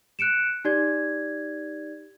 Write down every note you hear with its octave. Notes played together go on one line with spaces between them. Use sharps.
F#6 C#7 D7 E7
D#4 G4 D5 G#6